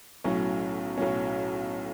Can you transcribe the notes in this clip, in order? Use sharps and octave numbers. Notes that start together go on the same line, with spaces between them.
B1 A2 F#3 C#4
B1 A2 F#3 C#4